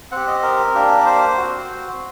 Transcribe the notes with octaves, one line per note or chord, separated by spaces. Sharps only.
C4 G4 F#5
D#5
A#4
A#3 D4 G4
D5
C5
C4 F#4